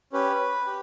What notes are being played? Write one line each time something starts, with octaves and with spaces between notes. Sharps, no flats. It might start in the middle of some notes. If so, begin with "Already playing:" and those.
C#4 G4 B4
G4